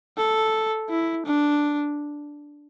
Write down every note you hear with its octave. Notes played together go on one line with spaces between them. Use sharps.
A4
E4
D4